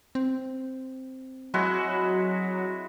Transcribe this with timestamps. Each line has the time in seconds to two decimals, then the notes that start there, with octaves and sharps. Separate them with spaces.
0.15 C4
1.54 F#3 G#3 E4 F#4